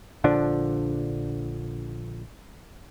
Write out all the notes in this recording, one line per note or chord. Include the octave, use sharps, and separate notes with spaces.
A#1 D3 F3 D4